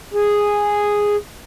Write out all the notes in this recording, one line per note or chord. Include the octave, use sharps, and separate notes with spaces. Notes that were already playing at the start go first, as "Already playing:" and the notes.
G#4